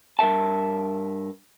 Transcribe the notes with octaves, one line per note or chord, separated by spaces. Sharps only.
G2 A#4 E5 A5